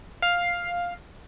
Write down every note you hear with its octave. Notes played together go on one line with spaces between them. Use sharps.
F5